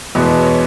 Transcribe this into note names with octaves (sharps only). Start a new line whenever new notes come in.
E2 B2 G#3 B3 D#5
C#5